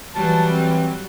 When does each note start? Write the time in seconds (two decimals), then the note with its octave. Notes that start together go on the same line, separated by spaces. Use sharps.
0.15 E3 F#3 G3 A5
0.50 C4